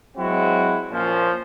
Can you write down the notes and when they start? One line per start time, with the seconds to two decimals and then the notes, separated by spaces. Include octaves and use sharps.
0.16 F#3 G#3 C4 E4 F#4
0.92 A#2 F3 C#4